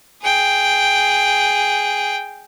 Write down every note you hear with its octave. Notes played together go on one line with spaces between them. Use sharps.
G#4 G5